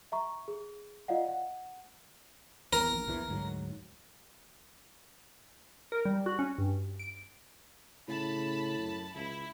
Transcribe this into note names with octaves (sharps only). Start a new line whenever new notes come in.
E5 A#5 C#6
G#4
F4 D5 D#5 F5 F#5
F#5
E2 A#4
A#1
A#1 E2 E3
D2 G#2 F#3
A#4
G3
F#4
C#4
G2
D7
A2 C#3 A5 B5
F#2
C#2 E4